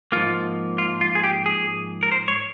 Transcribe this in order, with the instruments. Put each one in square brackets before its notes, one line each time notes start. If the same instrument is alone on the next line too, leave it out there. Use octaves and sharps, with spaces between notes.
[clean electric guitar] G#2 F3 A#3 F4
F4
F4
G#4
G4
G#4
A#4
C5
C#5